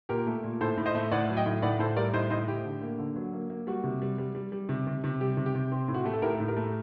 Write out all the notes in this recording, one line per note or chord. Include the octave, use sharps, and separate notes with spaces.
A#2 G4 A#4
A3
A#2
A2 A4 C5
A2
C5 D#5
A3
A2 D5 F#5
F#3
D#5 G5
A2
A2 D5 F#5
A2 A4 C5
G3 A#4 D5
A2 C5 D#5
A2 C5 D#5
A2 G4
D3
A#3
D3
F#3
A#3
A#3
G3 F#4
C3
G3
G3
G3
G3
C3
C3
C3
G3 G4
C3
G4
C3
C4
A2
F#4
A3 G4
A4
A2 G4 A#4
A2
G4 A#4
A3